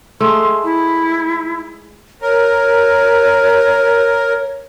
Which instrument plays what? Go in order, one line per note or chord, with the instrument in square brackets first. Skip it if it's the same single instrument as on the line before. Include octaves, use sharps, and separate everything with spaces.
[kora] G#3 A3 [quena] C6
[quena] E4
[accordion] A#4 [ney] C#5